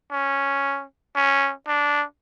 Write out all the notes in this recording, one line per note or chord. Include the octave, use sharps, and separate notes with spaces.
C#4
C#4
D4